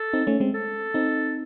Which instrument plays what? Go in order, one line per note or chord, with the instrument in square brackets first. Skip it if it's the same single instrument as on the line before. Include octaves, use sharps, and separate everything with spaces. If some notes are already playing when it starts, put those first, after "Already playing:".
Already playing: [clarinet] A4
[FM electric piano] C4 D#4
A3 C#4
G#3 C4
[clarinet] A4
[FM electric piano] C4 D#4